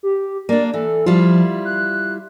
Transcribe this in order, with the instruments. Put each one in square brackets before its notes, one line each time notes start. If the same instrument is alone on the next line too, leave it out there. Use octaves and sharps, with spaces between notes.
[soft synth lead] G4
[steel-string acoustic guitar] A#3 D4 [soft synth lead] D5
[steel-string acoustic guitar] E3 [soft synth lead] A4
[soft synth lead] F3 [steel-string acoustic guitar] G3 E4 F4
[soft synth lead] F#6